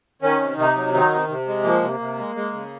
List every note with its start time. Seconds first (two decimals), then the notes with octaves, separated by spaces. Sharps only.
0.22 D#3 C#4
0.41 C3
0.57 C3 D#4
0.76 F#3
0.93 D#3 D#4
1.11 C3
1.28 C3
1.47 G#3
1.64 F3 A#3
1.83 C3
2.00 C3
2.18 G#3
2.36 G#3
2.53 C#3